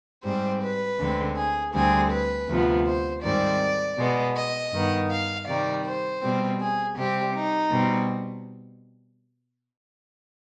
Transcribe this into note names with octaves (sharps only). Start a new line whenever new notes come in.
G#2 G3 C4 C5
B4
D2 D3 G#3 C4
G#4
D2 D3 G3 C4 G#4
B4
D2 C3 F3 B3
C5
G#2 D#3 G3 C4 D5
B2 G#3 B3
D#5
G2 D#3 B3
F5
C3 D#3 G3 D5
C5
B2 G3 C4
G#4
C3 G3 C4 G4
D#4
B2 G3 C4